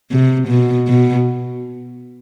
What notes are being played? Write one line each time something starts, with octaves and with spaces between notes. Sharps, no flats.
C3
B2
B2